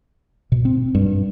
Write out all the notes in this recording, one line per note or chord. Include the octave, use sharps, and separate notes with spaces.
B2
C4
G2